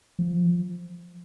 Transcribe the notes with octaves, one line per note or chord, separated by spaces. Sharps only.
F3